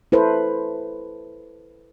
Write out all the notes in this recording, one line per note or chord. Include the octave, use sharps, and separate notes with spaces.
E4 A4 B4 C5